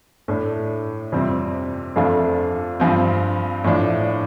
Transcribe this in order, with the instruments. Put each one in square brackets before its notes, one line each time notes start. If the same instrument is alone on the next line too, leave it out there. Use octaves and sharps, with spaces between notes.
[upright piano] A2 A3 D4
F2 C3 G3 C4
F2 F3 A3 D4 F4
G2 F3 C4
A2 F3 D4